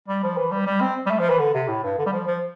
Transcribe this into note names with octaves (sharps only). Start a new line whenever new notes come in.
G3
F3
E3
G3
G3
C4
G3
A3
F3
E3
D3
C3
A2
G2
D3
G3
F3
F3